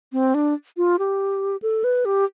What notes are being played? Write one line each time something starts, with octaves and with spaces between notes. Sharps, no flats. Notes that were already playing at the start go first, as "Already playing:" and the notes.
C4
D4
F4
G4
A4
B4
G4